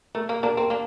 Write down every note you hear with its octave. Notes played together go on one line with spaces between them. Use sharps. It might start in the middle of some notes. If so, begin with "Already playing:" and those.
A3 A#4
A#3 A#4
A#3 D4 A#4
C4 A#4
A#3 D4